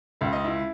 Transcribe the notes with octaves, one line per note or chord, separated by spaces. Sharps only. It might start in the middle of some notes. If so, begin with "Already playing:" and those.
C#2 E5
D#5
E4 E5